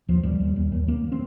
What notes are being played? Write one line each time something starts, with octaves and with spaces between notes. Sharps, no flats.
D#2 F3
D#2 G3
D#2
D#2
D#2
D#2 A#3
C4